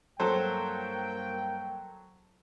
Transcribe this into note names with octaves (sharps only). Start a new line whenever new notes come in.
G2 F#3 A#3 A4 C5 G5